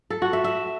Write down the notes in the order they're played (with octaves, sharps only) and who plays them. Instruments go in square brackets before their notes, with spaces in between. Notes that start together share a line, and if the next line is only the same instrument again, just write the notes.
[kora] A4
F#4
E5
E5